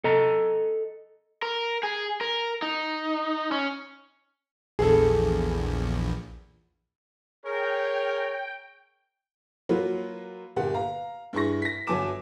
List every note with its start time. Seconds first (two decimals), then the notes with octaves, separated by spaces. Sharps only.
0.04 A4 D#5 A#5
1.42 A#4
1.83 G#4
2.21 A#4
2.62 D#4
3.52 C#4
4.79 A#1 E2 G#4 A4
7.45 G#4 A#4 C#5 G5
9.69 F#3 A#3 F4 F#4 B4
10.56 G1 A#2 G4 F#5
10.74 F5 A#5
11.33 G2 E4 G#4 C#6 A#6
11.62 A#6 B6
11.87 G1 F#3 G#5 A5 D6 E7